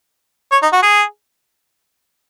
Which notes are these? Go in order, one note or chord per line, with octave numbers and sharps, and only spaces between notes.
C#5
D#4
F#4
G#4